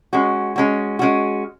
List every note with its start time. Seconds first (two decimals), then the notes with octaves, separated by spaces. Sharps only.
0.13 G#3 C#4 F#4
0.56 G#3 C#4 F#4
0.99 G#3 C#4 F#4